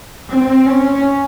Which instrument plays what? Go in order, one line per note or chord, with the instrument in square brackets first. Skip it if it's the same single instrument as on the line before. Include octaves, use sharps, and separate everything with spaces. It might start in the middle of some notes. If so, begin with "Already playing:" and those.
[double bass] C4
C#4